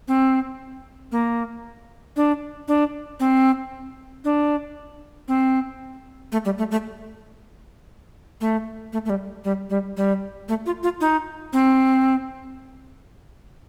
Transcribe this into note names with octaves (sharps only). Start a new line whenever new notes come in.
C4
A#3
D4
D4
C4
D4
C4
A3
G3
A3
A3
A3
A3
A3
G3
G3
G3
G3
A3
F4
F4
D#4
C4